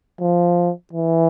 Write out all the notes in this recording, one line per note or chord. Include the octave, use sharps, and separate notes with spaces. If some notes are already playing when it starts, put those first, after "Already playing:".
F3
E3